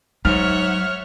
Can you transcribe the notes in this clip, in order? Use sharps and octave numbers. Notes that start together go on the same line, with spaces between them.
G#2 F#3 C#5 E5 F#5 F6